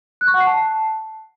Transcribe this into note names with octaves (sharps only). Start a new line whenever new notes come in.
F#6
C#6
F#5
C7
A5